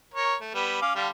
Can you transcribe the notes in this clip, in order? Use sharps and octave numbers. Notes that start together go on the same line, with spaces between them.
A#4 C#5
A3
G3 B3
C#4 F5 D6
D3 G3 F5